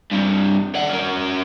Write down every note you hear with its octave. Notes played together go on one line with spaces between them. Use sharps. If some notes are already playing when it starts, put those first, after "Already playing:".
G2 C3
D5 F#5
C#4 A#4